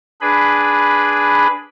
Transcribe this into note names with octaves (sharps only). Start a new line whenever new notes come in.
D4 G#4 B4 B5